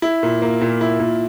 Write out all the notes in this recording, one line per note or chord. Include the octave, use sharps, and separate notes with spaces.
E4
A#2
A#3
A#2
E4
A#2